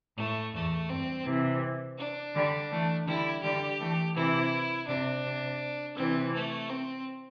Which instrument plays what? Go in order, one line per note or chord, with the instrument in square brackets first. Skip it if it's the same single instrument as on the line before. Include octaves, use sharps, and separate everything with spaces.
[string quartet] A2 [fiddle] A3
[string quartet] E2 [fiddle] A3
[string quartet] G2 [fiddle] C4
[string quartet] C3 E3
[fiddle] D4
[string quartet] D3 G3
E3 A3
[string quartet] D3 G3 [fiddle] E4
[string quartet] D3 G3 [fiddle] G4
[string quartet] E3 A3
[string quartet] C3 E3 [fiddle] E4
[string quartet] C3 [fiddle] D4
[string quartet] C3
[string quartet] C3 E3 [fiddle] C4
[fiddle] A3
C4